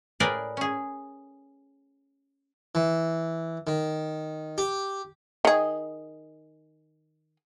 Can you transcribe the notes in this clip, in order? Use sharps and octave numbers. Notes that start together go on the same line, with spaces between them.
A2 G#4 A#4 B4 D5 G5
C#4 G#4
E3
D#3
G4
D#3 G#4